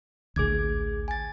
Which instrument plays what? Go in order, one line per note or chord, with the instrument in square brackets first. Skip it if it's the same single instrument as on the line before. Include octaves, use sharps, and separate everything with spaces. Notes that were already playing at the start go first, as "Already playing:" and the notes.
[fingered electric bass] A1 D2 [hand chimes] G#4 D6 G#6
[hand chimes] G#5 A6